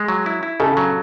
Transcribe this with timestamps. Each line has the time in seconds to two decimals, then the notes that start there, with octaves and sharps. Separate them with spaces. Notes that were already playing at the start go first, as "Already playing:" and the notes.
Already playing: G#3
0.08 F#3
0.26 E4
0.43 E4
0.60 C#3 A4
0.77 F#3